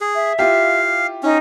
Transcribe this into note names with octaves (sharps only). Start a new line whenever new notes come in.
G#4
E5
E4 F4 G4 F5
C#4 D#4